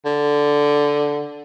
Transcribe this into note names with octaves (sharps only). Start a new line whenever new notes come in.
D3